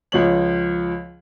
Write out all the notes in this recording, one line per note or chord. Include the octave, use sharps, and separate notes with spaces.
C#2 F3 C#5 F#7